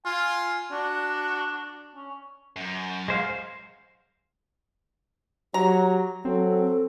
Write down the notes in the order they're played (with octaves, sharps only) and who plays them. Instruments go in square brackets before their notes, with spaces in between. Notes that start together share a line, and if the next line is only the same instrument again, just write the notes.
[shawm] F4 [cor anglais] G#5
[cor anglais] D4 [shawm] F#4
[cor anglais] C#4
[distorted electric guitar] F#2
[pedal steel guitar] G#3 C5 F5
[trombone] F#3 [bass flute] G4 [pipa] A#5
[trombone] F#3 [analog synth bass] C4 [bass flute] A4